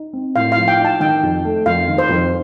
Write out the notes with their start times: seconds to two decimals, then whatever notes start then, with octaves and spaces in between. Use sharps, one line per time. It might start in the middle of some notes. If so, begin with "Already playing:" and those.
Already playing: D#4
0.13 C4
0.36 A2 F5
0.52 F5
0.57 F3
0.68 G5
0.79 D#4
0.85 A5
1.00 D#3 G5
1.23 F2
1.44 A3
1.66 F2 F5
1.88 D#3
1.98 C5
2.09 F2